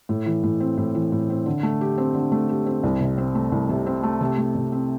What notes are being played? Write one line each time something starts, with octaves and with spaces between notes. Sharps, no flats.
A2
E3
A2
C4
A2
E3
A2
C4
D3
A3
G4
C4
D3
A3
G4
C4
C2
C3
C4
A3
C2
C3
C4
A3
C3
A3
C3
C4